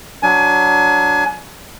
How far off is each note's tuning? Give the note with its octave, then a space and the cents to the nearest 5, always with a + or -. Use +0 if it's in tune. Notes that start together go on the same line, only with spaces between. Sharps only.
F#3 +0 D4 +0 G#5 +30